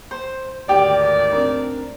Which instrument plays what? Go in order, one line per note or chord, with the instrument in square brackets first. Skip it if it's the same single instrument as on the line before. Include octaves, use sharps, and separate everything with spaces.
[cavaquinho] C5
[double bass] D2 G#2 [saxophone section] D#3 D5 [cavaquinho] G4
[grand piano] C4 D4 A#4